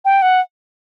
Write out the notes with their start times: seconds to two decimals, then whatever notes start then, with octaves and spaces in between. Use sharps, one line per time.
0.05 G5
0.22 F#5